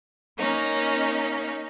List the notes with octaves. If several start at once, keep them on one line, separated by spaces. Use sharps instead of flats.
A#3 C#4 D#4